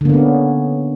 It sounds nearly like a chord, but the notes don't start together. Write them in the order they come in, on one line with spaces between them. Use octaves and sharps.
D3 A#3 B3 C#4